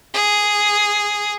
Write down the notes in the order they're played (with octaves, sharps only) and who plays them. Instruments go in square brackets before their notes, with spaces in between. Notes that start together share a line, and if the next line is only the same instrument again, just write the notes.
[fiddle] G#4